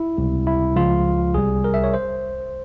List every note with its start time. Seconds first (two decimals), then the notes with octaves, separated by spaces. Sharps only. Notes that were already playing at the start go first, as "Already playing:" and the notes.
Already playing: E4
0.17 C#2 C3 G3
0.47 E4
0.76 C#2 C#3 F3 F4
1.34 C2 C3 G3 G#4
1.64 A#4
1.74 E5
1.84 C#5
1.94 C5